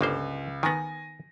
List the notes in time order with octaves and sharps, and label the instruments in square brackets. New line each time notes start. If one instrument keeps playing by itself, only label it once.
[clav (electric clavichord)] G1 A#3 C5 [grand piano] C#2
[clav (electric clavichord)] D#3 B3 [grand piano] G#5 A#6